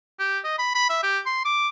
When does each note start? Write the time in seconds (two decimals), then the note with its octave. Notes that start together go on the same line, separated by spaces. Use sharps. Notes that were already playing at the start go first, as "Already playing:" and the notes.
0.19 G4
0.44 D#5
0.58 B5
0.75 B5
0.90 E5
1.03 G4
1.26 C6
1.45 D6